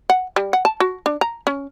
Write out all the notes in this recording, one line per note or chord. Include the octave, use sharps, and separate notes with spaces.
F#5
G3
F#5
A5
F#4
D4
A#5
C#4